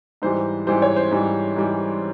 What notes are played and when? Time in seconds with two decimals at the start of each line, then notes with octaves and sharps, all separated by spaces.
0.22 G#2 E3 G3 C5
0.67 G#2 E3 G3 C5
0.82 C#5
0.97 C5
1.11 G#2 E3 G3
1.56 G#2 E3 G3